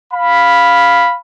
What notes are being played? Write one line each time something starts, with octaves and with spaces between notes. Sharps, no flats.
F5 B5